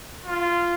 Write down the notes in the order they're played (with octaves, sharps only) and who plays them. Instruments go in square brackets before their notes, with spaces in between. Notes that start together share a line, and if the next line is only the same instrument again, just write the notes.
[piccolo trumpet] F4